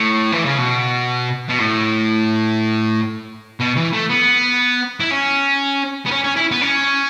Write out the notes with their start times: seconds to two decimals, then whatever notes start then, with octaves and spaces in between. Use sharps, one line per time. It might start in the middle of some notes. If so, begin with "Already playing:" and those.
Already playing: A2
0.32 E3
0.45 C#3
0.58 B2
1.49 B2
1.58 A2
3.60 B2
3.77 E3
3.93 A3
4.10 B3
5.00 E4
5.11 C#4
6.06 B3
6.11 C#4
6.24 C#4
6.36 E4
6.51 B3
6.61 C#4